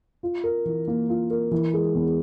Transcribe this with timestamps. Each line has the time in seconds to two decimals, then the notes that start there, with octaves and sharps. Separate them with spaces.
0.23 F4
0.44 A#4
0.65 E3
0.87 A#3
1.09 F4
1.30 A#4
1.51 E3
1.74 G#3
1.95 E2